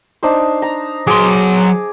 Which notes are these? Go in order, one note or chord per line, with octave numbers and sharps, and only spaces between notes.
D4 D#4 C5
A#5
F#3 G#4 C6 D6